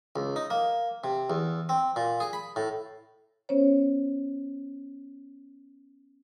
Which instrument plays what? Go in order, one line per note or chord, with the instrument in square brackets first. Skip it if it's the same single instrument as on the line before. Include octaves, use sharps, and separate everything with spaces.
[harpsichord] C#2
D#4
A#3
C3
E2
C4
A#2
G#4
B5
A2
[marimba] B3 C#4 C5 C#5